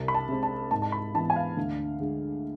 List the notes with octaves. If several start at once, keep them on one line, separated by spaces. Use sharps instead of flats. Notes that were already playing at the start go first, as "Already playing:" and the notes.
Already playing: C2
B5
A5
C3 G#3 C4
A5
G#2 A5
A5
B5
E3 B3 A5
G#5
F5
D2
D3 G#3